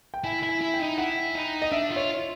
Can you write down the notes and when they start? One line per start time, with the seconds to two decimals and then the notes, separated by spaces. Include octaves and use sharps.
0.14 G5
0.24 E4 G#5
0.43 E4
0.49 G#5
0.61 E4
0.74 G5
0.80 D#4
0.98 E4 F#5
1.35 D#4
1.62 D#5
1.72 D4 E5
1.90 F4
1.96 C#5